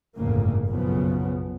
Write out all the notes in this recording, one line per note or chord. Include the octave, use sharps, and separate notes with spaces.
G1 F2 A2 C#3 A#3
B1 F#2 C#3 F3 B3